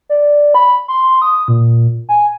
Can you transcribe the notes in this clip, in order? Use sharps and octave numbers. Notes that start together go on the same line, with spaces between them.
D5
B5
C6
D#6
A#2
G#5